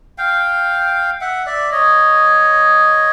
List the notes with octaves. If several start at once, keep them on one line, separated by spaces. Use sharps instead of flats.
F5 G5
E5 F#5
D5 E5
C#5 D#5